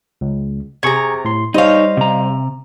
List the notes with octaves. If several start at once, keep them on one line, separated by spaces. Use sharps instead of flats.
C#2
C3 G#4 A#5 C#6 G#6
A2 C6
G3 D#4 C5 C#5 D#5 F5
C3 A#5